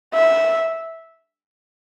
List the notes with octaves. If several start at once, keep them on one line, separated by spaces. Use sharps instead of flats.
E5